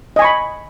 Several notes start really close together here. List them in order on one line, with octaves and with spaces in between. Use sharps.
D#5 G#5 C#6 B5